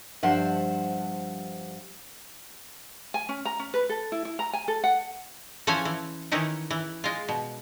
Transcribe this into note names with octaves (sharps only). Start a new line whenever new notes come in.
G2 F3 C5 E5 F#5
G#5
C#4
A#5
C#4
B4
A4
E4
E4
A#5
G#5
A4
F#5
E3 F3 C#4 C5 C#5 G#5
E3
D#3 E3 C#4 D#4 E4
E3
G#3 F4
B2